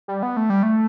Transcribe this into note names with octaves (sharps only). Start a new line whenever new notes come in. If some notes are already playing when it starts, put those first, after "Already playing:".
G3
B3
A3
G3
A3